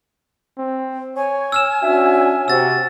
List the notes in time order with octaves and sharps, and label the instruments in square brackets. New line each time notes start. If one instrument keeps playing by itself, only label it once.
[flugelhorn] C4
[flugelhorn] C#5 [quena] G#5
[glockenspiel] E6 F6 E7
[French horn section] C#4 D4 F#4 [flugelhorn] E5
[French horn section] C3 [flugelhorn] F#4 [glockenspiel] E6 A6